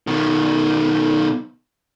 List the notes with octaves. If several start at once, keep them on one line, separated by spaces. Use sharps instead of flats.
B2 D#3